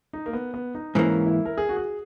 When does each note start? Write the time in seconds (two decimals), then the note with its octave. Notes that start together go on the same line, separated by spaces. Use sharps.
0.13 D#4
0.26 A#3
0.33 B3
0.54 B3
0.75 D#4
0.95 G#2 E3 A#3 C#4
1.26 E4
1.45 A#4
1.58 G#4
1.69 F#4
1.77 G#4